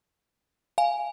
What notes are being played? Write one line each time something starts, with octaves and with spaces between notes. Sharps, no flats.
F5 G#5